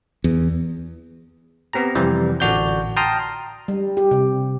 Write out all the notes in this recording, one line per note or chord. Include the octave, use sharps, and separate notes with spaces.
E2
B3 C4 G4 A#5
F2 C3 E3 G3
A1 D3 D4 F#4 D5 G6
G5 A5 A#5 C6 D#6 F6
G3
G4
C3